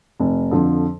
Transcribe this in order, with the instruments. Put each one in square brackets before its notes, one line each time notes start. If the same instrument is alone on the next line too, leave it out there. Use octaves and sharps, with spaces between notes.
[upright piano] F1
F2 D3 F3